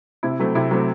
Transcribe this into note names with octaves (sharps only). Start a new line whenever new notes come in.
C3 E4
F#3 A3 C4
C3 E4
F#3 A3 C4